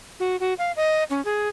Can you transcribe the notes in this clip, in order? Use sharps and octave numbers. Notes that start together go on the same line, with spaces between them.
F#4
F#4
F5
D#5
C#4
G#4